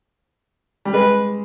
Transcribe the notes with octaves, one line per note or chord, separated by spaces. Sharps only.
G3
G#3 B4